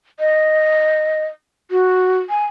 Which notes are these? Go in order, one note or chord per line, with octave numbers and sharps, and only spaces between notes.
D#5
F#4
G#5